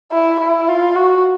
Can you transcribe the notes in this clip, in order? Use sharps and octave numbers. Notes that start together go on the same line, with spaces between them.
E4
E4
F4
F#4